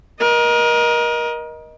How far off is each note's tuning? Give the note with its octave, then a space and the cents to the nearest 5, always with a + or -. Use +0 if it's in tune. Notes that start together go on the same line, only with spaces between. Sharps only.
A#4 +30 D#5 +0